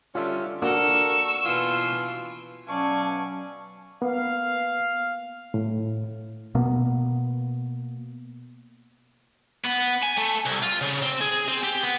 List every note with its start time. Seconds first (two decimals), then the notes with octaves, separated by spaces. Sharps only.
0.15 D3 G3 C#4 F4 E5
0.62 A#3 D4 F#4 A4 A#4 C#6 E6
1.44 B2 E3 F4
2.68 B2 F#3 C#4 D5 F5 G#5 A5 C#6
4.02 A#3 B3 F5
5.54 A2
6.55 B2 A#3 B3
9.64 B3
10.03 G#5
10.18 A3
10.46 C2
10.63 F4
10.81 C#3
11.02 C4
11.21 G#4
11.48 C4
11.63 G4
11.83 B3